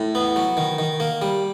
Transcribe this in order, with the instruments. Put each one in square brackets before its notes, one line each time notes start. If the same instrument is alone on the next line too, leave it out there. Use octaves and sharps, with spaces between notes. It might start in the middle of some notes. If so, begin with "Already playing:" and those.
Already playing: [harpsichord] A2
B3
F#3
D#3
D#3
A#3
G3